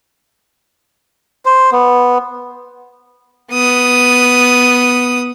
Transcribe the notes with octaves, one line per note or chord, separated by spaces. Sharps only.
C5
B3
B3 D#6